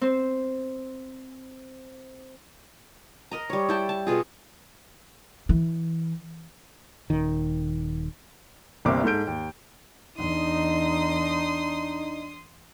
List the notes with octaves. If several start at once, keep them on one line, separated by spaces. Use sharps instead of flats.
C4 C5
A#4 D#5 A#5
G3 C#5
E4 G5 A5
A5
B2 F4 G#4
E3
D#1 D#3
G1 C2 A#3 C4 D6
G#2 G#3 A4 G6 D7
D#2
E2 D4 D#4 C6 D#6